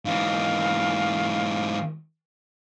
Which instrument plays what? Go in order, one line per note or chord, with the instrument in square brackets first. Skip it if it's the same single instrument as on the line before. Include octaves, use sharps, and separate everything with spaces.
[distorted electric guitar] G#2 E3 [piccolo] F5